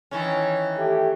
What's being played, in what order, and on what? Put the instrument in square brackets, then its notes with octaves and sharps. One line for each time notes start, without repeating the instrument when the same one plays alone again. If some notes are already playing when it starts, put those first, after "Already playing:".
[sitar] D#3 E3 C#4
[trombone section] A3 G4